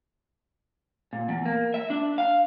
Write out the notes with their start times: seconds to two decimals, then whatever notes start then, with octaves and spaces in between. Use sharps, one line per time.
1.13 A#2
1.29 E2
1.45 A#3
1.74 E5
1.90 D4
2.18 F5